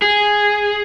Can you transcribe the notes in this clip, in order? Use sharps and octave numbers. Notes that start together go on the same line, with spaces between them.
G#4